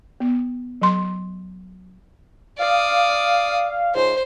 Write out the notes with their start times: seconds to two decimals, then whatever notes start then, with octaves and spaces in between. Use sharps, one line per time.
0.20 B3
0.82 F#3 C6
2.59 D5 F5 D#6
3.94 C#2 G#2 C5